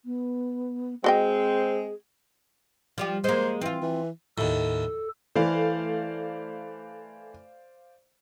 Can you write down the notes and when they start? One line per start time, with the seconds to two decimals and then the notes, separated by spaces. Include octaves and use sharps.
0.05 B3
1.04 G#3 C4 F#4 G#4 D#5 G5
2.98 F3 G3 G4
3.24 G#3 A#3 C5
3.61 E3 C4 F4
3.82 E3
4.38 D#2 A2 A4
5.36 E3 A3 C5 D5 F5